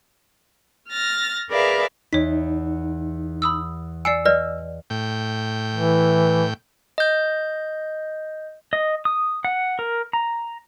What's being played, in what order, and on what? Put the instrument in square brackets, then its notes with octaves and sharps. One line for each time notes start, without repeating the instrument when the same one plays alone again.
[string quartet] F6 A6 A#6
G#4 A#4 B4 D5 E5 F5
[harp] E2 [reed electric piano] D#4 [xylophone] C#5 B6
[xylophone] B5 D#6 E6
[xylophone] D5 C7 C#7 [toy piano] G#5 [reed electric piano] E6
[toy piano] B4 D5 [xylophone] D#5
[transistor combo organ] A2 G5
[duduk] E3
[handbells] D#5 G6
[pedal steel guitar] D#5
D#6
F#5
A#4
A#5